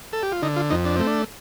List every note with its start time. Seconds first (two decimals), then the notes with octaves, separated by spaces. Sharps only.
0.13 A4
0.23 G4
0.32 F4
0.42 D3 D#4
0.56 F4
0.70 F2 D#4
0.85 D4
0.96 A3 C4
1.07 D4